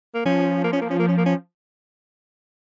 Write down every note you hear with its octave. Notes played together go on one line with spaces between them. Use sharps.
A#3
F3 C#4
A#3
C#4
A#3
C#4
A#3
C#4
A#3
C#4